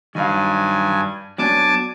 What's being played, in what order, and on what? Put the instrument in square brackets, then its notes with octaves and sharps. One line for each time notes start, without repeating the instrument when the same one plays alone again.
[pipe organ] G2 G#5 [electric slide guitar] D#3 F#3 F5
[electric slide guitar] F#3 B3 D4 [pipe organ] G#5 A5 D6